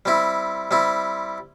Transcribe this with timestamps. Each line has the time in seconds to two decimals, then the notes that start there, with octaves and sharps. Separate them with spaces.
0.05 G3 C4 E4
0.71 G3 C4 E4